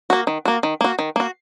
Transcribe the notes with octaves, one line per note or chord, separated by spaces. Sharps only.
A#3 F#4
D#3
A#3 F#4
D#3
A#3 F#4
D#3
A#3 F#4